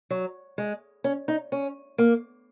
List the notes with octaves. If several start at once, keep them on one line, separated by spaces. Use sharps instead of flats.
F#3
G#3
C#4
D#4
C#4
A#3